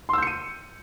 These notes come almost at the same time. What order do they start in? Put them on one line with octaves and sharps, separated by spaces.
C6 E6 G6 C#7 D#7